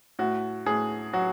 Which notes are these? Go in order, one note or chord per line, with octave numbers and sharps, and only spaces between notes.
A2 F#4
A2 G#4
F#3 F#4